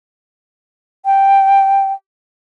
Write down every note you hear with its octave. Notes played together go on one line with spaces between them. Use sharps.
G5